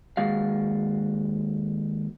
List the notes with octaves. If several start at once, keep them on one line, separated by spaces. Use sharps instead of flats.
D#2 G#3 F#4 F5